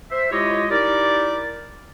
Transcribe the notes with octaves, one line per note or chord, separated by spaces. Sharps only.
C5 E5
G#3 E4 F4 G4 C#5 D#5
D#4 E4 G4 A#4 D5